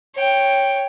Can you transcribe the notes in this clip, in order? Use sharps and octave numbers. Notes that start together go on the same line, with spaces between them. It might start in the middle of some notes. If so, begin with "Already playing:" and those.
C#5 G5